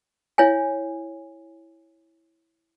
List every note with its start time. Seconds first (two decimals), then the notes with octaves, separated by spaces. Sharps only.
0.38 E4 C#5 F5 G#5